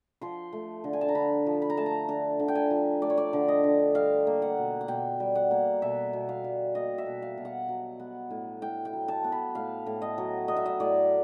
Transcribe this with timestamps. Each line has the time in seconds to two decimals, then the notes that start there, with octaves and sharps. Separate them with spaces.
0.21 F3 C6
0.53 A3
0.84 D3
0.93 G#5
1.01 A5
1.09 A#5
1.15 D3 B5
1.47 F3
1.62 B5
1.70 A#5
1.77 A3 A5
1.86 A#5
2.08 D3 A5
2.39 D3
2.48 G5
2.55 G#5
2.71 F3
3.02 A3 D5
3.10 C#5
3.18 D5
3.33 D3
3.48 D#5
3.64 D3
3.95 G3 F5
4.27 A#3
4.42 F#5
4.57 B2
4.81 F#5
4.88 B2 G5
5.20 G3
5.35 F#5
5.51 A#3
5.82 B2 E5
6.13 B2
6.29 F5
6.44 G3
6.75 A#3 D#5
6.98 E5
7.06 B2
7.22 F5
7.38 B2
7.45 F#5
7.69 F#3
8.00 B3
8.30 A2
8.62 A2 G5
8.85 G5
8.93 F#3
9.08 A5
9.24 B3
9.32 B5
9.55 A2 F5
9.86 A2
10.02 D#5
10.18 F#3
10.48 B3 D#5
10.57 E5
10.66 D#5
10.80 A2 D5